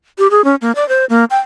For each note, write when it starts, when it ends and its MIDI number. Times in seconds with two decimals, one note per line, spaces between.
0.18 0.28 67
0.31 0.44 68
0.44 0.55 61
0.61 0.72 58
0.76 0.87 74
0.89 1.05 72
1.10 1.24 58
1.30 1.39 79